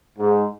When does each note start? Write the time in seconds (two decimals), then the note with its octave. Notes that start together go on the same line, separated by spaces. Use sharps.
0.19 G#2